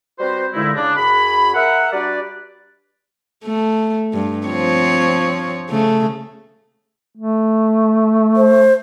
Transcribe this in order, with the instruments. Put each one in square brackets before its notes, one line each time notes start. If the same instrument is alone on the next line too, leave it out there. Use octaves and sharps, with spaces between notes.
[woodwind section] G3 C4 F#4 B4 C5
G2 A#2 D3 G#3 D#4 E4
C#3 D4
F#2 G#4 B5
A#4 E5 F#5
G3 D4 F#4 G4 B4 D5
[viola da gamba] A3
G2
F3 C4 C#5
C#3 A3
[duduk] A3
[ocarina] C5